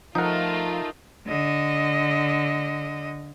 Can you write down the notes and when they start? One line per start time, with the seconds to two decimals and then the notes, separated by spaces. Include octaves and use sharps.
0.15 F3 A3 D#4 F4 A#4 F#5
1.26 D3 D#5